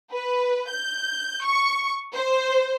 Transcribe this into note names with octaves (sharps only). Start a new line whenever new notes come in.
B4
G6
C#6
C5